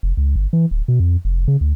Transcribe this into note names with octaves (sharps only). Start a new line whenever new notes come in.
F1
C#2
G1
E3
D1
B2
F2
F1
C#3
D2